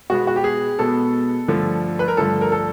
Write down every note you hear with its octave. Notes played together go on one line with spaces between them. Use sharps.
B2 G#3 B3 F#4
F#4
G4
G#4
B2 G#3 B3 A4
G2 D3 F3 A3
B4
A#4
G2 D3 F3 A3 A4
A#4
A4